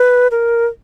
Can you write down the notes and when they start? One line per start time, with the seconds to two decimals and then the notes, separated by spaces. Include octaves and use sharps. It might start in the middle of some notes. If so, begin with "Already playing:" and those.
Already playing: B4
0.31 A#4